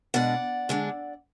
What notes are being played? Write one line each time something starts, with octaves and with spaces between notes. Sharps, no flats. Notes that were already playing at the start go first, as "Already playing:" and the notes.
B2 G#3 D4 D5 F#5
D3 G#3 D4